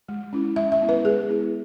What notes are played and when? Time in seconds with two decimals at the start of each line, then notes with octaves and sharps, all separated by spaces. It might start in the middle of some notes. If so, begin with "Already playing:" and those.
0.09 G#3
0.33 C#4 E4
0.56 G#3 E5
0.72 E5
0.81 B3 E4
0.89 B4
1.05 G#3 G#4
1.29 B3 E4